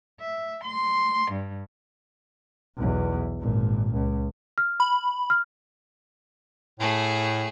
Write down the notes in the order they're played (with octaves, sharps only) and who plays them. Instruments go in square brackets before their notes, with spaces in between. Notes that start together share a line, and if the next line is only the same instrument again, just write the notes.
[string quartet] E5
C6
G2
[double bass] B1 E2
G#1 A#2
C#2
[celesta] F6
[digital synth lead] B5
[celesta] F6
[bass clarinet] A2 [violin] A3 G#4